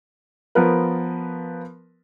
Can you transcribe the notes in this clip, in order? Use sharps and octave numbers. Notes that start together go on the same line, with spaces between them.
F3 B3 A#4 B4